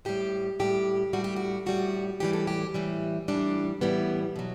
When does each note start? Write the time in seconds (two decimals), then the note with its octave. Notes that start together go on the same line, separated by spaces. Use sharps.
0.05 A2 G3 G4
0.60 A2 G3 G4
1.13 A2 G3 F#4
1.24 G4
1.36 F#4
1.66 A2 G3 F#4
2.20 A2 E3 G3 G4
2.33 A4
2.47 G4
2.74 A2 E3 G3
3.28 A2 E3 G3 D4
3.81 A2 E3 G3 B3
4.36 B2 F#3